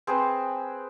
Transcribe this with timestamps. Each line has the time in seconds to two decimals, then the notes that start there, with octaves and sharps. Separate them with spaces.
0.07 C4 G#4 B4 C5